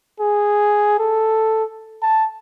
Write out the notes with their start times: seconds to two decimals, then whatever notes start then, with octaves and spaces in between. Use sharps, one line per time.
0.20 G#4
0.99 A4
2.02 A5